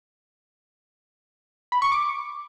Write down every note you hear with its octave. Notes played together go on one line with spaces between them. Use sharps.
B5
C#6
D6